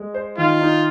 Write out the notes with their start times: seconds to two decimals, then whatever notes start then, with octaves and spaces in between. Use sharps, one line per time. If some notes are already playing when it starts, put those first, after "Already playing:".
Already playing: G#3
0.14 C5
0.38 D#3 F4
0.61 D#4